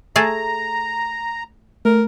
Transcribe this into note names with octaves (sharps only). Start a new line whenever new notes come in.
A3 G#4 A5 A#5
A3 A#4